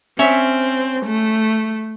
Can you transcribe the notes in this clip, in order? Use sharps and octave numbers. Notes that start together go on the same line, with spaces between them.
C4 C#4 E5
A3